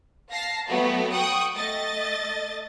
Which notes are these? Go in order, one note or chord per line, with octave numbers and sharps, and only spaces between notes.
F5 A5 A#6 C7
F#3 A3 B3 F#4 G4
F#5 G5 C#6 D#6
A3 D#5 A6